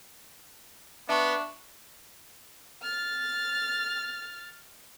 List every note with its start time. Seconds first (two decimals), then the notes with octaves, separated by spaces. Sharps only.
1.09 B3 D4 E5 A5 C#6
2.82 F6 A6